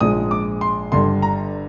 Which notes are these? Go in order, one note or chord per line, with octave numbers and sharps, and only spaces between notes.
A#1 G#2 F3 G#3 D#6
D6
C6
G1 G2 D3 C6
A#5